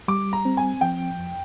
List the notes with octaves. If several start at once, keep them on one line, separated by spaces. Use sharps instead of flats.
G3 D6
A#5
C4
G#5
F3 G5
F2